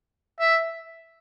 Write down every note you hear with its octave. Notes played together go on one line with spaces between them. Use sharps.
E5